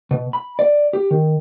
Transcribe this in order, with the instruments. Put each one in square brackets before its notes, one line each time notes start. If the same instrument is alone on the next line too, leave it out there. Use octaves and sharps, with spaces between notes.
[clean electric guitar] B2
B5
D5
G4
D#3